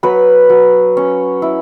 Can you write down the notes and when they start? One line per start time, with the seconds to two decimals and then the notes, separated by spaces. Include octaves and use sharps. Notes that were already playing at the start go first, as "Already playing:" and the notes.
0.03 F#3 B4 B5
0.49 F#3
0.97 C#4
1.42 E4